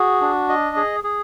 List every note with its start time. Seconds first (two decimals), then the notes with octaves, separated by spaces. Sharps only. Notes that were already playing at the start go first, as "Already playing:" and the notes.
Already playing: F#4 G#4
0.21 D4
0.49 D#5
0.76 G#4
1.04 G#4